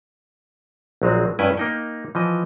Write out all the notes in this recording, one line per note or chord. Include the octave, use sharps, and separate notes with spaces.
A#1 F#3 G#3 C4
G2 C#4 E4 B4 G5 G#5
A#3 D#4 G5
E3 F3 D#5